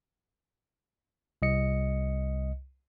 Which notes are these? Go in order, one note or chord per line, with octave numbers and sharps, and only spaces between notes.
C2 D#5 C#7